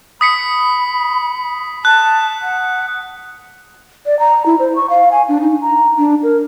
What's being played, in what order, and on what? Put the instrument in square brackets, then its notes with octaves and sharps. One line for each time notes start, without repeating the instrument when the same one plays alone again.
[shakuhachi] B5 [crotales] D#6 B6 C#7
[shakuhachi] A5 [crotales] F#6
[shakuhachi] F#5
[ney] D5
A#5
E4
C5
C#6
F5
G#5
D4
D#4
A#5
D4
A#4